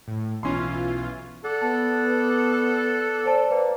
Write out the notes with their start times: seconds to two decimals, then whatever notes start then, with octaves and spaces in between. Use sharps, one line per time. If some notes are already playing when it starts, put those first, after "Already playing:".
0.08 A2
0.43 B1 E3 C#4 F4 C6
1.44 A4 D5 F#5
1.61 B3 A5
3.25 C5 D5 A5
3.50 A#3 B4